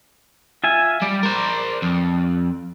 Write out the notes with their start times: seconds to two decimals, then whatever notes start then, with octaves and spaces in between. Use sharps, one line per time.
0.64 F4 E5 G#5
1.02 G3 D5
1.23 A#4 C5
1.82 F2